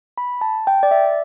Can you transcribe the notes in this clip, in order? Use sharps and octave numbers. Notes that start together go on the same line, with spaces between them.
B5
A5
G5
D5
E5